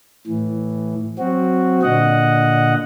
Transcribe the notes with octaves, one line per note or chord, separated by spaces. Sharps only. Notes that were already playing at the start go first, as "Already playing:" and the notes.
A2 E3
F#3 C4 F#4
A#2 D3 D#5 F#5